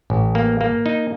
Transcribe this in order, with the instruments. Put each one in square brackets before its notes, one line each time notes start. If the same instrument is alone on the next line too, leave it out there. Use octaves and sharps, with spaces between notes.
[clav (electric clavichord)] A1
A#3
A#3
D#4